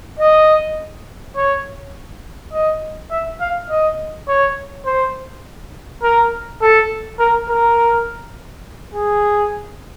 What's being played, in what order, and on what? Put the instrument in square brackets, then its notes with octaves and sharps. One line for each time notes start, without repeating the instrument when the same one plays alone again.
[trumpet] D#5
C#5
D#5
E5
F5
D#5
C#5
C5
A#4
A4
A#4
A#4
G#4